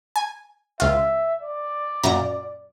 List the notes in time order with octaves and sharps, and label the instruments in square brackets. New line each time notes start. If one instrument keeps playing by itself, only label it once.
[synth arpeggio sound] G#5
[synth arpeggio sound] C#2 F4 [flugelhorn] E5
[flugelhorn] D5
[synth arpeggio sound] F#2 A#2 A#5